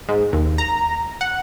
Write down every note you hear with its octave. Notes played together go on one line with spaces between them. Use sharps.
G#2
D#2
A#5
F#5